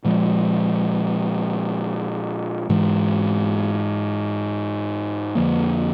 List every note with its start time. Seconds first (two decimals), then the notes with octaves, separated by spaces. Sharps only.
0.05 A#2 F3 G#3
2.69 G#2 E3 G#3
5.35 F2 D3 F3 A#3